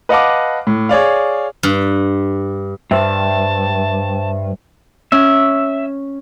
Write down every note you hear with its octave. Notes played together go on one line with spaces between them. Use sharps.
B4 D#5 F5 F#5 A5 D6
A2
G#4 C#5 D5 F5
G2
G2 C5 E5 G5 A5
C#4 E5